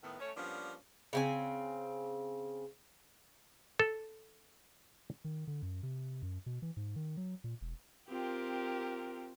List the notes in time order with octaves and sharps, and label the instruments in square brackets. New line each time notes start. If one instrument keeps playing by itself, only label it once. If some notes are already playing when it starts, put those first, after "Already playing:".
[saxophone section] A2 D#3 B3
A3 C#4 C#5
F3 G3 A#3 B3 C#4 D4
[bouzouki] C#3 C4 G#5
[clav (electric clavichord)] A4
[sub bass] D#3
D3
F#2
C3
F#2
B2
E3
G#2
D#3
F#3
A#2
E1
[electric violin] C4 F4 [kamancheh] G4 A#4